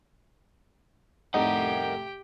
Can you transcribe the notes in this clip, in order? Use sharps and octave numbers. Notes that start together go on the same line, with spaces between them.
F1 A2 C3 D#4 G4 A#4 F#5 G5